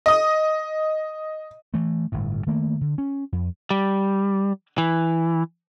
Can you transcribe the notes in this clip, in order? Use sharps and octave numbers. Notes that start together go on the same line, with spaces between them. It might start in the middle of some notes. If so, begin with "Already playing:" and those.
D#5 D#6
E3 A3
G1 A2
D#3 A3 A#3
D3
C#4
F2
G3
E3